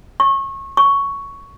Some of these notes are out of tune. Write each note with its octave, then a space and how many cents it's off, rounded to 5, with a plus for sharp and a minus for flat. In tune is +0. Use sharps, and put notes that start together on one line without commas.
C#6 -25
C#6 +10